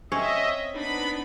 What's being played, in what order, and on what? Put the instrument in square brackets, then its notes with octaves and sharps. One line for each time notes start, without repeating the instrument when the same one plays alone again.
[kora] C4 C#4 C#5 [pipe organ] D#5 E5
[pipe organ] B3 B5 [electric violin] D4 D#4